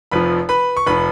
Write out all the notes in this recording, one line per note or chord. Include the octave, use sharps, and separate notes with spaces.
F1 F2 F3 B4 B5
B4 B5
C#6
F1 F3 B4 B5